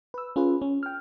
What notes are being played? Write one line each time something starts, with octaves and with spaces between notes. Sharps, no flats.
B4 E6
C#4 F4 G#4 B4
C#4
G5 F6